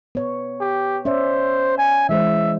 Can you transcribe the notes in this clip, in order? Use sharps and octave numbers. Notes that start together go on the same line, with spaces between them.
B3 C#5
G4
C#4 C5 D5 E5
G#5
E3 G#3 C5 E5